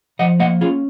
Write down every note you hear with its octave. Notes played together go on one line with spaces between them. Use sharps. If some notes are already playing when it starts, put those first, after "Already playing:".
F3 D#5 F#5
A#3 D#5 F#5
C#4 F4 G#4